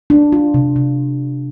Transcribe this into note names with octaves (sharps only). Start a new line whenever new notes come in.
D4
F4
C3
C3